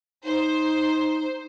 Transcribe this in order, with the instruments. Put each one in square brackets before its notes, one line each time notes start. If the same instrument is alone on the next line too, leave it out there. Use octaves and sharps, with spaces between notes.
[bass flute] D#4 [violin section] C5